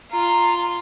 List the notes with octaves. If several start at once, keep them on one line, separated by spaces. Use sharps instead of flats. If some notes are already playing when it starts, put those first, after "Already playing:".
F4 A#5